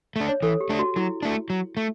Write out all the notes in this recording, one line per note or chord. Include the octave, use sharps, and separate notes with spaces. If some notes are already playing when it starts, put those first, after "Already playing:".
A3 D4
C#5
E3 A4
G4
A3 D4
F#4
F#3 E4
A3 D4
F#3
A3